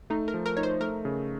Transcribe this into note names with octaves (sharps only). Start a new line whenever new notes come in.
A3 D#4
A#4
F3
A#4
D#4 C#5
C5
A3 A#4
C#3